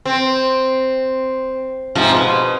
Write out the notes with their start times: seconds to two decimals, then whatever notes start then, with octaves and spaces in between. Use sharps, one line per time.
0.05 C4
1.95 G#2 C3 F3
2.17 B2